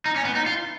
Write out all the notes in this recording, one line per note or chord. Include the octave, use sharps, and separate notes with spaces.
D#4
C#4
B3
D#4
F4